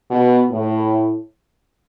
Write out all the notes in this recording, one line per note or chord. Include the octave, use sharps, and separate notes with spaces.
B2
A2